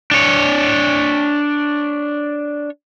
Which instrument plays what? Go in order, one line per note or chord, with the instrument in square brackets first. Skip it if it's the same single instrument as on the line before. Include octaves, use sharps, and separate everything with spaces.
[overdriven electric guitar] D4 C#5